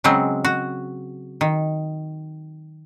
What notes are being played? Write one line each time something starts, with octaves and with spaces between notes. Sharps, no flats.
C#3 F#3 G#3 C4
F#4
D#3